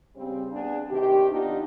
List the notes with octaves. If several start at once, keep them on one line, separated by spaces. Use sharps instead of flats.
C#3 G3 C4
B3 D4 G#4
C3 D#3 G4
B3 D4 D#4 F4 G4